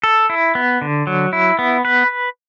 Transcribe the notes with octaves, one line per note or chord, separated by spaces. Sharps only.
A4
E4
B3
D3
F#3
E4
B3
B4